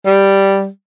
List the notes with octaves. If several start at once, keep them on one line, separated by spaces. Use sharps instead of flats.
G3